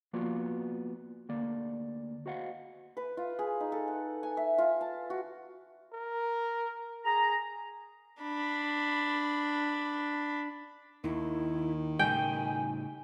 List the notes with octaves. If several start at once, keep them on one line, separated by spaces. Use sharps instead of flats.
F3 A#3 B3 F4 F#4 D5
D2 A#3 D5
F#4 C5 D#5 F5 F#5
B4
F4
G#4
D#4
A4
F#5
G#5
E5
F4
A5
F#4
A#4
G#4 A#5
D4 B5
D#2 D#3 E4
A2 C#3 G3 G5 G#5